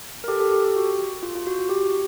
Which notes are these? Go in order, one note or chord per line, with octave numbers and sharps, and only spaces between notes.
A#4
G4 A4
G4 A4
G4 A4
G4
F#4
F4
F4
F#4
F#4
G4